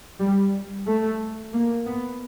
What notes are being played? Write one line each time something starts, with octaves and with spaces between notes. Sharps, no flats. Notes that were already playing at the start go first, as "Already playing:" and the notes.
G3
A3
A#3
B3